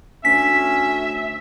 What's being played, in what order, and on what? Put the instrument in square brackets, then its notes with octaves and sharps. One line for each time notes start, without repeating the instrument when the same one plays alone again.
[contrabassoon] D2 [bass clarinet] C#4 [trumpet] E5 [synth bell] B6